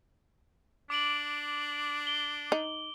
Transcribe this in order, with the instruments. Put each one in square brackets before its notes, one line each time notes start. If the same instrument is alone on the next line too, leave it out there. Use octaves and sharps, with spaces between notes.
[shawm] D4 [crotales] D6 D7 F#7
[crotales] G7
[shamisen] D#4